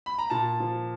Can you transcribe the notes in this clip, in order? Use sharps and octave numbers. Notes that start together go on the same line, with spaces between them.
B5
A#5
A#2 A5
F3